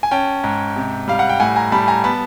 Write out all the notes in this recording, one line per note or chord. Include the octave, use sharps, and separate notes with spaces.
G#5
C#4 G5 A5
G#2
C3
G3 F5
F#5
G5
A2 F#5 G#5
G#5 A#5
G3 A5 B5
G#5 A#5
B3 A5 B5